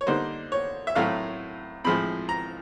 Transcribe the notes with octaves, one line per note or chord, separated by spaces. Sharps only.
C#5
D3 G3 A#3 D#4 C5
C#5
E5
A2 F#3 A3 C4 F5
A2 F3 G#3 C4 B5
A#5